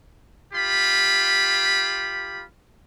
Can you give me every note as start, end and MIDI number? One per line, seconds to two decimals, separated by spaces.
0.53 2.43 65
0.53 2.43 67
0.53 2.43 83